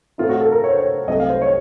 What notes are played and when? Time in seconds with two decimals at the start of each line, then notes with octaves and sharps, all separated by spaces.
0.18 A2 A3 C4 D#4 F4
0.29 F#4
0.41 A4
0.52 A#4
0.64 C#5
0.70 C5
0.78 C#5
1.08 C2 C3 F#3 A3 D#5
1.20 F5
1.30 C5
1.42 C#5